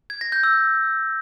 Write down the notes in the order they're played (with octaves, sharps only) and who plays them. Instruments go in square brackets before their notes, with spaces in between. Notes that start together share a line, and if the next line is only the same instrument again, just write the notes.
[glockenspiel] G#6
A#6
G6
E6